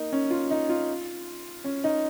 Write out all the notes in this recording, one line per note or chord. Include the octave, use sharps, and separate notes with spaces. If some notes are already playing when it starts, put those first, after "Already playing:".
Already playing: A#3 D#4
C#4
F4
D#4
F4
C#4
D#4